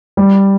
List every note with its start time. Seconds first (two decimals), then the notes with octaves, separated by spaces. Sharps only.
0.17 G3